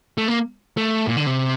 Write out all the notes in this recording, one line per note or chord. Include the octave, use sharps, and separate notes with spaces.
A3
A#3
A3
A#2
D3
C3